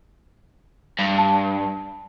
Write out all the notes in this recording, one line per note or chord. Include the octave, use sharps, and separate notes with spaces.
G2
A5